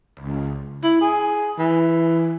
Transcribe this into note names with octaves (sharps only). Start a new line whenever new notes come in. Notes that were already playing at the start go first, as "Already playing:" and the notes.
C#2
E4
G#4
E3